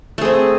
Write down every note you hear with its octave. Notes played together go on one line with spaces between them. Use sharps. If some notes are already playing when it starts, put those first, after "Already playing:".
A3 C4 G#4